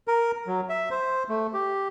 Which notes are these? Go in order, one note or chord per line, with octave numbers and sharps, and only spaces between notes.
A#4
F#3
E5
C5
A3
G4